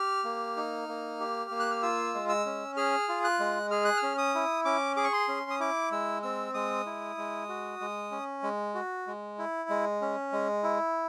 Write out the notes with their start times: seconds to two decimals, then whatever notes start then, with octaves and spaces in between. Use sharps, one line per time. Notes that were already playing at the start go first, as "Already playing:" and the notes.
Already playing: G4 F6
0.24 A#3
0.57 D#4
0.89 A#3
1.20 G4
1.51 A#3
1.60 F#6
1.71 F6
1.82 F4 E6
2.14 G#3
2.29 E6
2.46 C#4
2.77 G#4 F6
3.09 F4
3.24 F#6
3.40 G#3
3.71 G#4 F6
3.85 F#6
3.97 F6
4.03 C#4
4.18 D#6
4.35 E4
4.65 C#4 D6
4.96 G#4 D6
5.04 C#6
5.13 C6
5.28 C#4
5.50 D#6
5.60 E4 D6
5.91 G#3 E6
6.23 C4 E6
6.54 G#3 D#6
6.86 E4
7.17 G#3
7.49 F#4
7.81 G#3
8.11 C#4
8.43 G#3
8.75 F#4
9.07 G#3
9.39 E4
9.69 G#3
10.01 C#4
10.32 G#3
10.63 E4